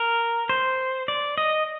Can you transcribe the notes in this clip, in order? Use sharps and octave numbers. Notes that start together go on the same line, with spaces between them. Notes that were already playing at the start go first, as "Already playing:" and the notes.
Already playing: A#4
C5
D5
D#5